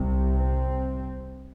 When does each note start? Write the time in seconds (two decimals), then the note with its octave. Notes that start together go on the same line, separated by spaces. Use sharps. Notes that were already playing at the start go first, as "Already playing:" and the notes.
Already playing: C2 C3
0.38 C4